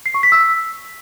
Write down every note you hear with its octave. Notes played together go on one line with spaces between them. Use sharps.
C7
C#6
B6
E6